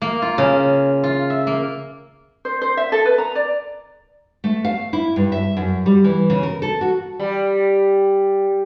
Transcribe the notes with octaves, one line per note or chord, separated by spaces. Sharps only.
A#3
F4
C#3
F4
E5
A#3
C5
C5
E5
A4
B4
A#5
D5
A3
F5
E4
G2
E5
F#2
G3
E3
C#3
A#4
A4
F#4
G3